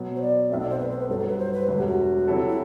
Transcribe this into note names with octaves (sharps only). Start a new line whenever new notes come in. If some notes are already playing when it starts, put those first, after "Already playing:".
Already playing: B2 F#3 B3
C5
D5
B1 B2 A3 C4 E5
D5
C5
B4
C5
B4
G1 G2 F#3 A4
A4
B4
C5
B4
E1 D2 D3 F#3
G4
F#4
C3 F#3 C4 E4 A4
E4